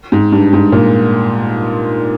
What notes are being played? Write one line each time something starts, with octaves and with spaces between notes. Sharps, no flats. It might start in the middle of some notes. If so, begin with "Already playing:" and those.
G#2
G2
G#2
A#2